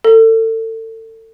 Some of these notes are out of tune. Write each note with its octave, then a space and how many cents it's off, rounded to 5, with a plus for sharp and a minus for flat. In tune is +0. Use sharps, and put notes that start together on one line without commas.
A4 +30